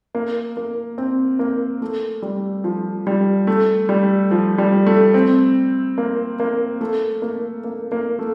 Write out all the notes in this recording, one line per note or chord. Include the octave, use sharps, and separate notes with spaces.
A#3
A#3
C4
A#3
A3
G3
F3
G3
A3
G3
F3
G3
A3
C4
A#3
A#3
A3
A#3
A#3
A#3
A3